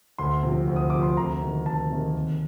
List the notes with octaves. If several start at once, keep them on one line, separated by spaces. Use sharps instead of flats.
D2 C6
C3 F3 C4
D2
D#6
C3 F3 C4 D6
C6
D2 A#5
C3 D#3 A#3
D2 A5
C3 D#3 A#3
D#2